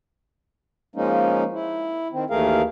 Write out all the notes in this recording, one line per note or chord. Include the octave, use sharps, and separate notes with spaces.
F3 G#3 A#3 C#4 D#4
E4
D#3 C4
D#2 E3 A3 G#4 A#4 F5